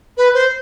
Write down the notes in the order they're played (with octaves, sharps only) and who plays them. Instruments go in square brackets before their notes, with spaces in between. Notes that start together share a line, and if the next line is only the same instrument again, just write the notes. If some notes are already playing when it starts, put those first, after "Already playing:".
[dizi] B4
C5